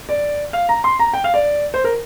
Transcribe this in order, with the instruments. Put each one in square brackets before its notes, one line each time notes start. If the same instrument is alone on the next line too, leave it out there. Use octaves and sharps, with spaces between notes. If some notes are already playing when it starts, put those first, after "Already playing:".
[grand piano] D5
F5
A#5
C6
A#5
G5
F5
D5
C5
A#4